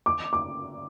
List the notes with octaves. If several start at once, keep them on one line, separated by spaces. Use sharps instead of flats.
D6
D6